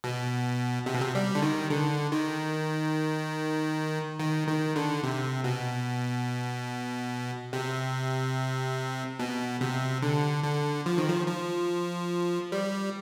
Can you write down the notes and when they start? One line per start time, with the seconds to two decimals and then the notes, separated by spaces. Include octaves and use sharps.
0.04 B2
0.86 C3
0.94 B2
1.01 C3
1.15 G3
1.35 D3
1.42 D#3
1.70 D3
2.12 D#3
4.20 D#3
4.48 D#3
4.76 D3
5.03 C3
5.44 B2
7.53 C3
9.19 B2
9.61 C3
10.02 D3
10.44 D3
10.86 F3
10.98 D#3
11.10 F3
11.27 F3
12.52 G3